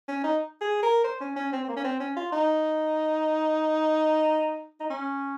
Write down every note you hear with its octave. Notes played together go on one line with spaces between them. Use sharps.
C#4
D#4
G#4
A#4
C5
C#4
C#4
C4
C4
A#3
C#4
C4
C#4
F4
D#4
D#4
C#4